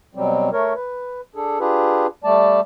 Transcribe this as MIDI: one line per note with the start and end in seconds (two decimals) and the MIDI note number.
0.15 0.50 47
0.15 0.50 54
0.15 0.50 55
0.15 0.50 60
0.53 0.73 57
0.53 0.73 70
0.53 0.73 73
0.75 1.21 71
1.35 1.59 62
1.35 1.59 68
1.35 1.59 69
1.60 2.07 62
1.60 2.07 65
1.60 2.07 67
1.60 2.07 68
1.60 2.07 71
2.24 2.60 55
2.24 2.60 57
2.24 2.60 74
2.24 2.60 81